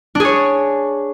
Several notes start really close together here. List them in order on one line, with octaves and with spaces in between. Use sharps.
D4 G#4 C#5